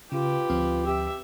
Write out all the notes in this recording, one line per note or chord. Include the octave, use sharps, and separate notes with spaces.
C#3 F4 G4 B4
D2 F3 C4
G4 E5